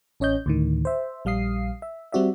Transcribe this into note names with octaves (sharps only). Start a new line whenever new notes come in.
A1 C#4 C#5 D#5 G6
D2 A2 D#3
C5 E5
A#1 G3 F5 D#6 C7
E5
G3 C4 F#4 D5 E5